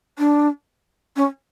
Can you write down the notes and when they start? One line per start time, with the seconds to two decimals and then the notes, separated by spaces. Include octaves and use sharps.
0.19 D4
1.16 C#4